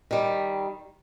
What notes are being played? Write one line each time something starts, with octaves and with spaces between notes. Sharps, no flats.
D#3 G3